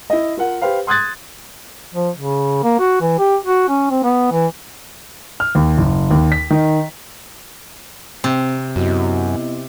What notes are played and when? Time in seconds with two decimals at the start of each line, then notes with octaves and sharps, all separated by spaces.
0.10 E4 D#5
0.37 F4 A#4 F#5
0.61 G4 B4 C5 F5
0.87 C6 D#6 F#6 G#6 A6
1.94 F3
2.16 C#3
2.63 A#3
2.79 F#4
3.01 E3
3.19 G4
3.45 F#4
3.69 C#4
3.91 C4
4.03 B3
4.32 E3
5.40 F6
5.55 D#2
5.78 F#1
6.11 D#2
6.32 B6
6.50 D#3
8.24 C3 C4
8.76 F#2 B3 E4 F#4 D#5